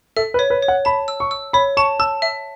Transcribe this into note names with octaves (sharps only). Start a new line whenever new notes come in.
A4 E5
B4
C#5
B4
C#5
F#5
A5 B5
E6
C#6
E6
C#5 B5
A5 C#6
A5 E6
E5